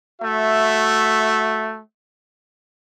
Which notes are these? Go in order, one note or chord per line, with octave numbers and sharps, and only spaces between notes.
A3 F#4 E5